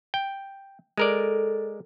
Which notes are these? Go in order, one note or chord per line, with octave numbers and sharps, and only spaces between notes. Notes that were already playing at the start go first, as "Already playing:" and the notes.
G5
G#3 A4 A#4 D5